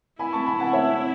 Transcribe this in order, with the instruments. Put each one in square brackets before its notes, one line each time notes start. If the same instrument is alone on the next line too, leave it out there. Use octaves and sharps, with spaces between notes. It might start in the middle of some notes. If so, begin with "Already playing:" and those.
[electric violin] E4 [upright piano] G#5 B5
[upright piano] A5 C#6
G#5 B5
F#5 A5
C#5 E5